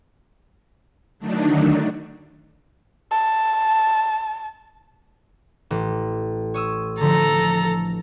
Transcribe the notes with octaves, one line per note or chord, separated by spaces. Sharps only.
D3 D#3 F#3 A3 D4 D#4
A5
A1
C#5 D#6 E6
D3 F3 A4 A#5